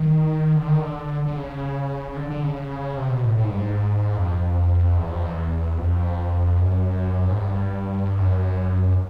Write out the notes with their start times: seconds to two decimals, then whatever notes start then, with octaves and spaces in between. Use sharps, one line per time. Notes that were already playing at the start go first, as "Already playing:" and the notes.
Already playing: D#3
0.56 D3
0.68 D#3
0.79 D3
1.25 D3
1.36 C#3
2.16 D3
2.30 D3
2.43 C#3
2.97 C3
3.10 B2
3.24 A2
3.37 A2
3.44 G#2
3.51 G2
3.58 G#2
4.17 F2
4.97 E2
5.11 F2
5.23 E2
5.78 F2
6.58 F#2
7.29 G#2
7.39 G2
8.19 F#2